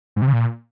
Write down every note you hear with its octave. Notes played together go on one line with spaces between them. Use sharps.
G#2
C3
C#3
A#2